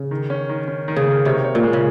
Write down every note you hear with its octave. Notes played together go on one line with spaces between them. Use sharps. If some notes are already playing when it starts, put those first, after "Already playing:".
Already playing: C#3
D#3
C#4
D#3
C#4
D#3
C#3
A#3
C3 C#5
C#5
A#2
G#3
C#3